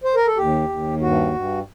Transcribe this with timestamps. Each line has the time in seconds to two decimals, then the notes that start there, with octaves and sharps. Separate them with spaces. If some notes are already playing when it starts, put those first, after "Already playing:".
0.04 C5
0.15 A#4
0.27 A4
0.37 D#2 G4
0.69 D#2
1.01 G2 F#4
1.34 G2